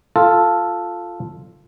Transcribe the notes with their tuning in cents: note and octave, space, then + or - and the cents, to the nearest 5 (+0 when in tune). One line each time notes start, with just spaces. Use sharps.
F4 +0 A4 +0